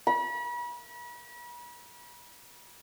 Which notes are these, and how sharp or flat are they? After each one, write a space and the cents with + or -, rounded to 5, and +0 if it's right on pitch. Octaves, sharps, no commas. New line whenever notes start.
B5 -40